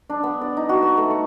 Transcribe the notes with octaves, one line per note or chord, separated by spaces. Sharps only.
D4
B3
D5
D#4
F#4
B3
A3
C#6